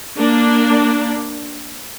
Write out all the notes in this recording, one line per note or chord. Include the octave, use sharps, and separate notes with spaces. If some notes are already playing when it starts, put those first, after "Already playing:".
A#3 D4